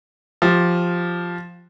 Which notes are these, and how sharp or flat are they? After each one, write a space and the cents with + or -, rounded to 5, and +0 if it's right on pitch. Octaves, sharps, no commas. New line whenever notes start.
F3 +0 G4 +0